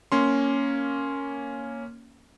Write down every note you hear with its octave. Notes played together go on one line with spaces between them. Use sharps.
A#3 C#4 C6